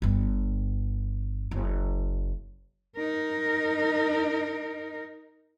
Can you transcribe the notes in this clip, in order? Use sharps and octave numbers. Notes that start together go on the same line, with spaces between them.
G1 G2
F#1
D#4 A#4